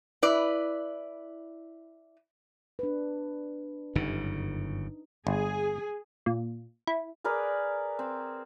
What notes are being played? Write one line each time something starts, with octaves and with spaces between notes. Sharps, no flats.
E4 B4 D5
D4 B4
G1 F#2 C#3 D#4
G1 G#4
A#2
E4
G#4 A#4 B4 D5
C4